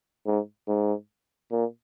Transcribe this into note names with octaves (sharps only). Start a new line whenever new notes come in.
G#2
G#2
A#2